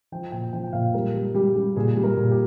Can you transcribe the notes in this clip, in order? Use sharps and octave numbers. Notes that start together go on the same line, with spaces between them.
F3 G5
A#2 G5
F3 G5
G5
A#2 F5
G3 A#4
G3
G3 G4
G3
A#2 G#4
G3
A#4
A#2
G4